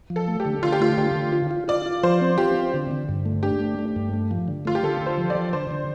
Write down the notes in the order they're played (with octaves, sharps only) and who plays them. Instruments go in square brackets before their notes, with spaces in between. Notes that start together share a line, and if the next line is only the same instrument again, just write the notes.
[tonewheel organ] F3
[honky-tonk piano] A4
[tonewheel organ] A3
[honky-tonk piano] G4
[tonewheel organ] D3
[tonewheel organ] D3 [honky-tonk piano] F4
[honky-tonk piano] G4
[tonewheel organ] A3 [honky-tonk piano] F4
[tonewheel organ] D3 [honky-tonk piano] G4
[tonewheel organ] D3
F4
F4
[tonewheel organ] F4 [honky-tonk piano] D5
[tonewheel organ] F4
[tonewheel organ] F3 [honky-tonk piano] C5
[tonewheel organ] C4
[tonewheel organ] F4 [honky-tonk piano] G4
[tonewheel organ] C4
D3
D3
G2
A3
[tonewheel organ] D4 [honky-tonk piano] G4
[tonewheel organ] A3
A3
G2
A3
F3
D3
[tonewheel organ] A3 [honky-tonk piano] F4
[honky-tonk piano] G4
[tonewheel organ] D3 [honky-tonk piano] A4
[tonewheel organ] D3
[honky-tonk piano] C5
[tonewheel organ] F3
[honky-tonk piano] D5
[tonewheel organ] F3
[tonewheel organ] D3 [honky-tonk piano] C5
[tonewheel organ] D3